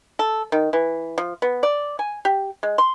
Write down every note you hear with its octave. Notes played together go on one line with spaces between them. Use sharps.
A4
D#3
E3
F3
B3
D5
G#5
G4
G#3
C6